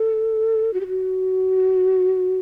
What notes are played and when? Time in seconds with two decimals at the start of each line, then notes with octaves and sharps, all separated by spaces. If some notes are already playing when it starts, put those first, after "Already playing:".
Already playing: A4
0.73 F#4
0.81 G4
0.88 F#4